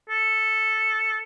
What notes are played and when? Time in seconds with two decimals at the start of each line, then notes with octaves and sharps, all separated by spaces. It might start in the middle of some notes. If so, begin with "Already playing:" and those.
0.10 A4